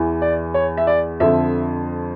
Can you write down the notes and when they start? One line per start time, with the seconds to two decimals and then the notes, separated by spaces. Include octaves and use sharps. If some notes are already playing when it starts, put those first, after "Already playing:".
Already playing: E2 E3
0.22 D5
0.54 C#5
0.77 E5
0.87 D5
1.20 F2 D3 F3 E5